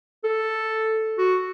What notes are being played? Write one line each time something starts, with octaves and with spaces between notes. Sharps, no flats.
A4
F#4